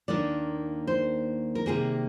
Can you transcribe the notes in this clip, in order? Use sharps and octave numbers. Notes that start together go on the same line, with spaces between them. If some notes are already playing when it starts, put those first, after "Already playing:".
D#2 D#3 A#3 D4 D5
C5
A#4
C3 D#3 G3 A#3 G#4